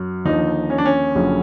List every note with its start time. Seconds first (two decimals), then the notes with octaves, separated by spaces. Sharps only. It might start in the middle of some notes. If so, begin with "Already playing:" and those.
Already playing: F#2
0.25 D#2 D3 F3 D#4
0.70 C#4
0.78 D4
0.85 C#4
1.15 F#1 F#2 D3 F3